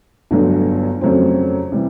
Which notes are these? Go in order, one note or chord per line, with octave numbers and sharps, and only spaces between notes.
G1 G2 D3 F#3
F2 C#3 F#3 A3 C4
C3 E3 G3